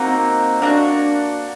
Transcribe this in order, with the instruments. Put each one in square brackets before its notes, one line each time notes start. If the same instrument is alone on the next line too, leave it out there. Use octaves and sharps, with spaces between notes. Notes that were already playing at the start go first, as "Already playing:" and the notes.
Already playing: [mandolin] A#3 D#4 F#4 [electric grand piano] C4
[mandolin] A#3 D#4 F#4 [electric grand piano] D4